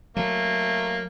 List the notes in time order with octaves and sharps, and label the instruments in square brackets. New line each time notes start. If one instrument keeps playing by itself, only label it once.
[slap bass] F#3 [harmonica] A3 A#3